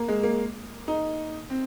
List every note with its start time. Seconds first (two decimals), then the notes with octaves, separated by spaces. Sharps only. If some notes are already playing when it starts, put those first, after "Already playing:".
Already playing: A#3
0.08 G#3
0.23 A#3
0.88 D#4
1.50 C4